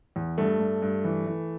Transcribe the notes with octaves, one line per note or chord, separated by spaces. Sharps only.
E2
G2 A3
G2
G2
E3
E3